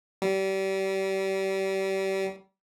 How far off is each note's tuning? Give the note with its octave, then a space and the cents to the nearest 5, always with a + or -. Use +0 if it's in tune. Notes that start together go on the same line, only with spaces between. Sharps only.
G3 -30